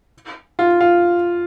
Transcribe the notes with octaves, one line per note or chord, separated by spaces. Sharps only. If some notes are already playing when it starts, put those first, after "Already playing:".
F4
F4